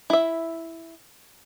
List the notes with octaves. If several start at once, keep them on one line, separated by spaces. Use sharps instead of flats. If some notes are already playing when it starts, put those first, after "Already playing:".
E4 E5